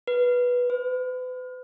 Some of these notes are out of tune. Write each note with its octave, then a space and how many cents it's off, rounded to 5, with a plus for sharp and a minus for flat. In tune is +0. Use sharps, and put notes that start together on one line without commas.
B4 -10
B4 +40